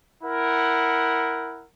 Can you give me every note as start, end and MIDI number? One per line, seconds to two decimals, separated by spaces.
0.24 1.66 64
0.24 1.66 70
0.24 1.66 78